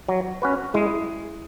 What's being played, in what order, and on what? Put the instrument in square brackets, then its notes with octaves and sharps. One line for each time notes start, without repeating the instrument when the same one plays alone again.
[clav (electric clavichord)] F#3
C#4 F#4 B4
[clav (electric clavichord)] G#3 [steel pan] E4 G#4